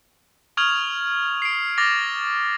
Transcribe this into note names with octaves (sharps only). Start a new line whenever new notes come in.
C#6 D#6 F6 G#6 F7 F#7
C7 D7
D6 F6 A6 A#6 C7 F7